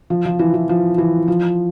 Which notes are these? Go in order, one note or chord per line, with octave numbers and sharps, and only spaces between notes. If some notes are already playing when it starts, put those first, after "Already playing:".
F3
F3
E3
E3
F3
E3
F3